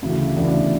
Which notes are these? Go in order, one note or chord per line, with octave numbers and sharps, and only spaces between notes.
D2 C#3 E3
D2 C#3 E3 B3 D4